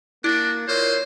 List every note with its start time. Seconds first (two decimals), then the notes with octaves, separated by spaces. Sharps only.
0.24 A#3 D4 E4 F#4
0.68 A#2 C5 C#5